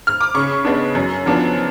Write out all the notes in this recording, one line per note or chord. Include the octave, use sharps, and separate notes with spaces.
F6
D6
C#3 C#6
G#3 B3 D4
F#2
F3 B3 D4